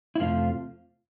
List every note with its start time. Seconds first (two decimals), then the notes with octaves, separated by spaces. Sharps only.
0.15 E4
0.20 F2 C3 F3 A3 F4